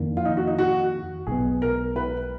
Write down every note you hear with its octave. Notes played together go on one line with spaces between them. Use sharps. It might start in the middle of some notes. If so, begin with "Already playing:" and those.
Already playing: F2 D#3 A#3 D4
F4
D#4
F#4
D#4
F#4
B1 B2 G#3 B3 G#4
A#4
B4